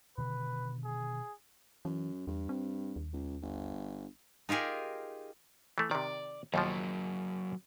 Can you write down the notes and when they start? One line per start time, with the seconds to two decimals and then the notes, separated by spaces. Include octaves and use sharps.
0.18 B2 D3 D#3 B4
0.85 G#4
1.85 F#2 E3
2.27 E2 G2
2.49 C4
2.96 D#2
3.13 C#2
3.42 G1
4.49 D#4 F4 G4 G#4 A#4
5.78 E3 A3
5.91 C3 D#3 D5
6.54 D#2 B2 F3 F#3 A#3